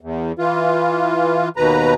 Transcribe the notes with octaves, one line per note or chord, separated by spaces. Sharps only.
E2
E3 F4
D#2 B2 B4 A#5